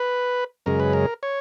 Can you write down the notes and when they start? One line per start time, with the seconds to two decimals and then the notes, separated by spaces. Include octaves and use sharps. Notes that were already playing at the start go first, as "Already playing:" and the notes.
Already playing: B4
0.66 F#2 C#3 G#3 A#4
0.80 B4
0.93 A#4
1.23 C#5